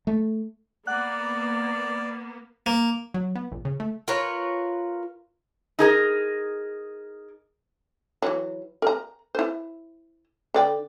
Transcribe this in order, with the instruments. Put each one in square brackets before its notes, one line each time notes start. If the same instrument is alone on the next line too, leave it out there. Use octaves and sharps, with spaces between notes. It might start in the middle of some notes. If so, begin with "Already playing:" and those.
[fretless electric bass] A3
[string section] A#3 B3 [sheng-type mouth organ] D5 [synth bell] F#5 F#6
[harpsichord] A#3
[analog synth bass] F#3
B3
A#1
C#3
A3
[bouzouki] F4 A#4 B4 C#5
[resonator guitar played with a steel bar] D#4 G#4 A#4
[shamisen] E3 F#3
A#4 A#5
E4 C5
D3 D5 G5